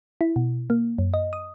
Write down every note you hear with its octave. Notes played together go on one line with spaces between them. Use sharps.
E4
B2
A#3
F#2
D#5
D#6